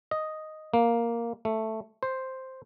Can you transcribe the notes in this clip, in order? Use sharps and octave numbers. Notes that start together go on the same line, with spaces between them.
D#5
A#3
A3
C5